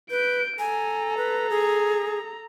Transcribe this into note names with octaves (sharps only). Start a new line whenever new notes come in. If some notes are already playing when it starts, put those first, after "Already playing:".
B4 G6 D7
A4 G#5 A#5
B4
G#4